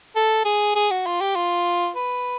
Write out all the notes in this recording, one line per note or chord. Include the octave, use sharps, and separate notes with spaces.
A4
G#4
G#4
F#4
F4
G4
F4
B4